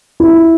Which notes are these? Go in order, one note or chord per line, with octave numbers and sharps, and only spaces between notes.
E4